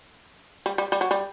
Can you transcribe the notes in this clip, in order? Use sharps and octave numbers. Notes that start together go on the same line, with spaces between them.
G3
G3
G3
F#3
G3